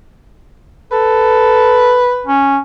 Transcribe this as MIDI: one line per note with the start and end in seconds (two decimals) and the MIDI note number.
0.92 2.03 69
0.92 2.32 71
2.27 2.58 61